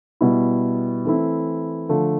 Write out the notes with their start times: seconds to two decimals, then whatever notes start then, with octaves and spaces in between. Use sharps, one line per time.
0.21 B2 G3 B3 E4
1.05 E3 A3 C4 E4
1.89 D3 F3 A3